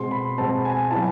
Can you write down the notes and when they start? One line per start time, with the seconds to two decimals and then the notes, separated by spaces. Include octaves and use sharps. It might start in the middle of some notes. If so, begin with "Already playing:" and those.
Already playing: B2 G#3 C4 C6
0.11 B5
0.38 B2 G#3 C4 A5
0.65 G#5
0.91 F#3 B3 E4 A5